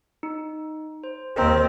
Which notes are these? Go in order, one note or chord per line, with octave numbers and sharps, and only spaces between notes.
D#4
C5
D#2 C4 A#4 D#5 A#5